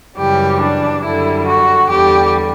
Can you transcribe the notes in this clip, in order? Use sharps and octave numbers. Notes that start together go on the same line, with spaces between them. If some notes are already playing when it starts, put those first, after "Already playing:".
F#2 C#3 E3 G3 G4
D4
F#2 D3 G3 E4
F#4
E2 D3 G3 G4